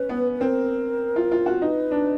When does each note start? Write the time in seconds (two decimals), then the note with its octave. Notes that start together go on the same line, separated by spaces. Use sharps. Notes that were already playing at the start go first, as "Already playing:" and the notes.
Already playing: C#4 B4
0.09 B3
0.35 B4
0.40 C4 A#4
1.16 F4
1.31 F4
1.46 F#4
1.61 D#4 B4
1.91 D4